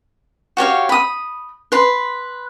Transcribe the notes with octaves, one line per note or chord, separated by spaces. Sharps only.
F#4 G4 C#5 F5
B5 D#6
B4 C6